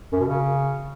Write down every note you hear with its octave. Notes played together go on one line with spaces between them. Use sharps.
F#2
B2
C#3